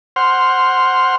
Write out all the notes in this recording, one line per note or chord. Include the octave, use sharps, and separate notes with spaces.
C5 F#5 C6 F6